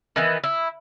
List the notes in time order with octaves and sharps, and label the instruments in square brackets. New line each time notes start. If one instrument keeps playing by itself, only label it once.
[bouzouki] D#3 E3 B3
E4